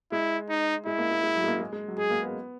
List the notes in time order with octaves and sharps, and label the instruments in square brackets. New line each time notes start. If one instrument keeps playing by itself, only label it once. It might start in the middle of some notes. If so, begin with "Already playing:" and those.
[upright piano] G#3 [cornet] E4
[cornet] D#4
[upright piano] G#3 [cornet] E4
[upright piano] A#3
G#3
G#3
F#3
G#3
A#3
G#3
G#3
F#3
[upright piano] G#3 [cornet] G#4
[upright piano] A#3
B3